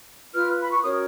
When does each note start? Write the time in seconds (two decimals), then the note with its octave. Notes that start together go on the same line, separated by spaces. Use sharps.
0.34 F4 B4 F6
0.61 B5
0.71 C#6
0.83 C#4 F#4 A#4 C#5 D#6